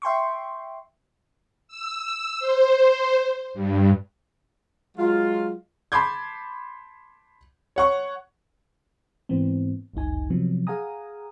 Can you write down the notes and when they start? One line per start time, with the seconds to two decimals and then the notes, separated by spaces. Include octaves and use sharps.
0.02 E5 G5 C6 C#6
1.68 E6
2.39 C5
3.54 G2
4.98 F#3 G#3 F4
5.92 A5 B5 C6 D6 G6 G#6
7.76 C#5 F#5 C#6
9.29 G#2 E3 B3 C4
9.93 G1 C#2 F#2 D#4 G#5
10.30 C3 F3 F#3 B3
10.67 G#4 F5 F#5 G#5 A#5 D#6